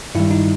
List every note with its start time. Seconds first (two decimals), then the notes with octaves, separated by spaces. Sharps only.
0.15 G2 D#3 G3 E4
0.31 D#4